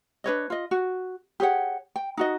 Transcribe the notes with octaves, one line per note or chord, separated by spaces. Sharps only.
D4 B4 C#5 D#5
F4 D#5
F#4
G4 G#4 C#5 F#5
G5
D#4 F#4 D#5